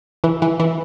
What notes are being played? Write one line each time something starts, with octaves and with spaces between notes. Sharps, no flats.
E3
E3
E3